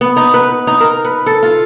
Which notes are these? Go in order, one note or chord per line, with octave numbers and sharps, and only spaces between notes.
B3
D#4
B4
D#4
A#4
B4
A4
F4